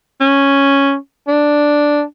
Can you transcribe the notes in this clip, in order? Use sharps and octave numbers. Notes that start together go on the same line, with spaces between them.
C#4
D4